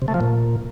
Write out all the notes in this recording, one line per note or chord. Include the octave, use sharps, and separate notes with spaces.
C3
A3
F3
A#2